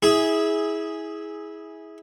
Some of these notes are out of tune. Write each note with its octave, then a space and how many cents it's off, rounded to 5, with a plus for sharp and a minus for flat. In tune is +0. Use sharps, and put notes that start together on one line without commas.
E4 -20 G#4 +0